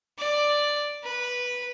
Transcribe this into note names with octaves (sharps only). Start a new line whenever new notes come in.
D5
B4